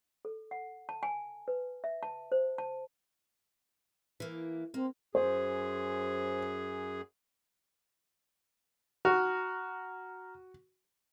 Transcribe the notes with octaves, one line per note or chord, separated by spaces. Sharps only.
A4
F#5
A5
G#5
B4
E5
A5
C5
A5
E3 A#3
A#3 C4
F#2 G#4 C5
F#4 A#5 F6